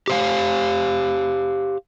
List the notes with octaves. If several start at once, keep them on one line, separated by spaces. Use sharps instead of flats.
G4 C5 F5